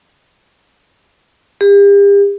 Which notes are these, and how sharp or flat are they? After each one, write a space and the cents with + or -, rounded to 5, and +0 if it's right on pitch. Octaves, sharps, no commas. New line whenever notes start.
G4 +40